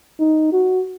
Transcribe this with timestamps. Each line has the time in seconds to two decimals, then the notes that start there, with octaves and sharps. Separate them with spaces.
0.20 D#4
0.52 F#4